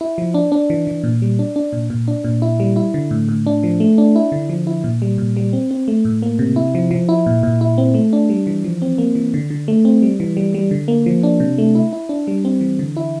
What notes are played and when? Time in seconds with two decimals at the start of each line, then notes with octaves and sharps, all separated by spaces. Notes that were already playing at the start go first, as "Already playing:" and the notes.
0.01 E4
0.18 F3
0.34 D4
0.52 D4
0.70 E3
0.87 E3
1.04 A#2
1.22 G3
1.39 D4
1.56 D4
1.73 A#2
1.90 A#2
2.08 D4
2.24 A#2
2.42 E4
2.60 G3
2.76 E4
2.94 D3
3.11 A2
3.29 A2
3.47 D4
3.63 F3
3.80 A3
3.98 D4
4.16 E4
4.32 D3
4.49 F3
4.67 E4
4.84 A#2
5.02 G3
5.18 A#2
5.37 G3
5.53 C4
5.71 C4
5.88 A3
6.05 A2
6.22 A#3
6.39 C3
6.56 E4
6.75 F3
6.91 F3
7.09 E4
7.26 A#2
7.43 A#2
7.61 E4
7.78 C4
7.94 A3
8.13 D4
8.30 G3
8.47 E3
8.64 F3
8.82 C4
8.98 A#3
9.15 E3
9.34 D3
9.50 D3
9.68 A3
9.85 C4
10.02 G3
10.20 E3
10.37 G3
10.54 G3
10.71 D3
10.88 A#3
11.06 F3
11.23 D4
11.40 C3
11.58 A3
11.75 E4
11.93 E4
12.09 D4
12.27 G3
12.45 C4
12.61 E3
12.79 D3
12.97 E4